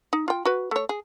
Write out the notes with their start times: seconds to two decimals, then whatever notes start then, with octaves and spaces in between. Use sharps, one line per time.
0.13 D#4
0.28 F4 G5
0.45 F#4 B4
0.71 A3 C#5
0.89 G#4